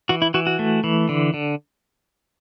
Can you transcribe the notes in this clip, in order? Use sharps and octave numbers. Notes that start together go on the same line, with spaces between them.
E3 F#4
E4
E3 F#4
F#4
A3
E3
D3
D3